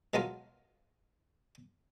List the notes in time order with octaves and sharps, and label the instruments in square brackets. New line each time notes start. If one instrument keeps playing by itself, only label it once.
[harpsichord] B2 F#3 G#3 A3 F4 A#4